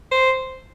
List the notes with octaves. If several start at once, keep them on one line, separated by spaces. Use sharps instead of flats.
C5